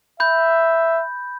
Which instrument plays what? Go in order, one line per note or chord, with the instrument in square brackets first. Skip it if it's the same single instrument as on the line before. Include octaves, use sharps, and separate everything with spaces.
[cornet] E5 [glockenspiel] B5 G6